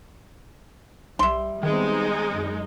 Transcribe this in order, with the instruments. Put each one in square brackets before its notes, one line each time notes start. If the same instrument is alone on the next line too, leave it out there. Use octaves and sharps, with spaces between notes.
[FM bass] B1 [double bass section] G3 [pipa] E5 C6
[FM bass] D#3 [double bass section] G3 B3 C4 [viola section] G#3 D#4
[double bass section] F#2